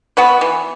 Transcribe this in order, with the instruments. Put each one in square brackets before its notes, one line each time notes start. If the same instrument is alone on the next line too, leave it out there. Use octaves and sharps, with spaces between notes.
[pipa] B3 F#4 B4
E3